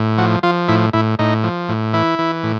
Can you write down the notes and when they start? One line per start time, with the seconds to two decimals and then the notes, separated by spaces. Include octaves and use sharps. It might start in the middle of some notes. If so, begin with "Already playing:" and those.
Already playing: A2
0.18 F3 F#4
0.43 F3 F4
0.68 A2 E4
0.93 A2 E4
1.19 A2 D#4
1.44 F3
1.69 A2
1.93 E3 E4
2.19 E3
2.43 A2